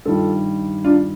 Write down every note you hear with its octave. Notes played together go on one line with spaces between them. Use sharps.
G2 D#3 G3 F4 A4
D4 F4